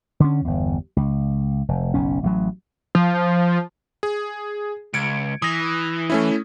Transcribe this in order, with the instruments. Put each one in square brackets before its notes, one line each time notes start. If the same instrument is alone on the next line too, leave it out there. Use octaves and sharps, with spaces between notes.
[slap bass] D3 C#4
G1 E2
C#2
F1
F#1 B1 C#4
A1 F#3
[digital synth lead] F3
[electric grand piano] G#4
[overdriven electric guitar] C#2 [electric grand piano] G#6 C#7 D7
[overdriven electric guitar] E3 [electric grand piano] D#6 A#6
[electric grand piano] A3 C#4 E4